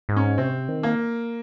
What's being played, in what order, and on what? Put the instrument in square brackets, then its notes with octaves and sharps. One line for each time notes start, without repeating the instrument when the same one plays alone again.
[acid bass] G#2
[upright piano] C#4
[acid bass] C3 [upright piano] C4
[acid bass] D#3
[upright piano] A#3